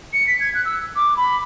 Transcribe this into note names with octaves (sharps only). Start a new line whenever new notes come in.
C#7
B6
G#6
F#6
E6
D6
B5